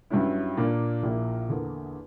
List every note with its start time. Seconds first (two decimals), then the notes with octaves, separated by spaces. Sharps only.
0.10 G2 F#3 C#4 E4
0.57 A#2 A#3 D4
1.03 A#1 A#2 A#3 E4
1.49 E2 D3 A#3